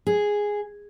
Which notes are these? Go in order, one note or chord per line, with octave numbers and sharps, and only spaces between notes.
G#4